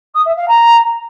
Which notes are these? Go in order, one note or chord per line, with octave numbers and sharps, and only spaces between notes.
D#6
E5
F5
A#5